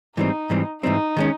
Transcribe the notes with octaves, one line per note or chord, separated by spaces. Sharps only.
G#2 E3 G3 C4 D#4
G#2 E3 G3 C4
G#2 E3 G3 C4 D#4
D#3 G#3 C#4